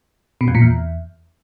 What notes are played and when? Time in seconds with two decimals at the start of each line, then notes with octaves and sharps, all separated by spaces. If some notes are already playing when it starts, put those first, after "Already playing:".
0.41 B2
0.48 F2
0.55 A#2
0.62 E2